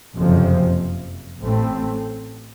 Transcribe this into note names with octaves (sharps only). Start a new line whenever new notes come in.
F#1 F2 C3 F3
A1 A2 A3 C4